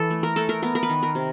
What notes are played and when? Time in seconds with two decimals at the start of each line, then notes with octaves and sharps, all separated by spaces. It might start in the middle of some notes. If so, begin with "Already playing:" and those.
Already playing: E3 A4
0.10 A3
0.23 A#4
0.36 A3 A4
0.49 A#4
0.62 B3 A#4
0.75 A#4
0.83 B4
0.89 D#3
1.03 A#4
1.15 C3